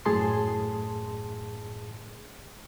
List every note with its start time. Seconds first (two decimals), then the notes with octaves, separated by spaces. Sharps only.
0.06 F#2 A2 G#4 A5 C6